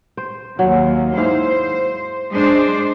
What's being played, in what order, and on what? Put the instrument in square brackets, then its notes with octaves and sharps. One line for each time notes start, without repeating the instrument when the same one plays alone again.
[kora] C5
[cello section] D#2 [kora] F#3
[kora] G#2 E4 F5 [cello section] C5
[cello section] G#3 D4 C5